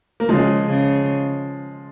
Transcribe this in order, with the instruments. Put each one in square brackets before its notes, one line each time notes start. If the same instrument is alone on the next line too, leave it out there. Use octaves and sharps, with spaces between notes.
[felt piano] A#3
[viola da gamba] C#3 [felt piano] F3 G#3
[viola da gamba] C#3